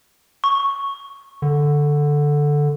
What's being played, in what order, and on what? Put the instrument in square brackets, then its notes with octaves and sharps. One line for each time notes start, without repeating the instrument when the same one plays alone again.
[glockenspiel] C#6
[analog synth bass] D3